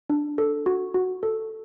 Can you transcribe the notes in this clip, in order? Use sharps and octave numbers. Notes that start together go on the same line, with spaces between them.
D4
A4
F#4
F#4
A4